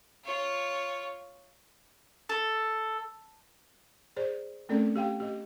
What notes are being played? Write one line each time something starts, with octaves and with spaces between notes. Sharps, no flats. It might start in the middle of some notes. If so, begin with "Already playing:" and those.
F4 C#5
A4
G#4 C5 D5
A3 C4 C#4 A4 A#4 D5
G4 F5 G5
G4 D#5